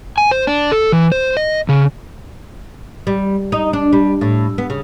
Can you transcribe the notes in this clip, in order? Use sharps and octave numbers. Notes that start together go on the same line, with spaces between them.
G#5
C5
D4
A4
E3
C5
D#5
C#3
G3
D#4
D4
G3
A2
B3
C#3